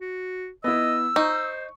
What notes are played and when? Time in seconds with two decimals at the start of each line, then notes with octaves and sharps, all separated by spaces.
0.01 F#4
0.64 B3 E4 D#5 E6
1.16 D#4 C5 C#6